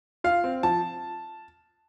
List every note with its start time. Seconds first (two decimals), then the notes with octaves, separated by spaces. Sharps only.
0.24 F4 F5
0.44 C4
0.63 F3 A5